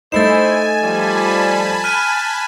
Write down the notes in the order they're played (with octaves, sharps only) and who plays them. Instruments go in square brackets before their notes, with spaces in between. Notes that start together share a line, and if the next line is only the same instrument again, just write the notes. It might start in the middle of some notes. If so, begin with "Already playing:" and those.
[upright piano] A3 D#4 [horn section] E4 A4 C5 [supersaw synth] G#5 [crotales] A6 E7
[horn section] F3 G3 [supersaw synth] G#5 A5 B5
[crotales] F6 F#6 D#7